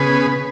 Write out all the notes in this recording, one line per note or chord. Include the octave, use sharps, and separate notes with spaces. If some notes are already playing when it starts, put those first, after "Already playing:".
Already playing: C#3 B3 G#4 B4